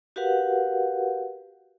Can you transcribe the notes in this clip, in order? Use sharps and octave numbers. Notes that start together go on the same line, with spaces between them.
F#4 G4 A#4 B4 F5 F#5